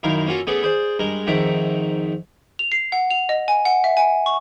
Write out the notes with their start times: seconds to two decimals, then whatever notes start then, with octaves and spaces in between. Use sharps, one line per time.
0.03 F#2 D#3 E4 A#4 F5
0.26 A#3 C#4 F4 F#4 A4
0.47 A3 B3 C#4 G#4 A4 D5
0.63 G#4 C5 D5
0.99 G2 G#3 A#4
1.27 F2 G#2 D#3 E5 F#5 D6
2.59 F7
2.72 C7
2.92 F#5
3.10 F7
3.29 D#5
3.48 G#5
3.65 F#5
3.84 E5
3.97 G#5
4.26 C#6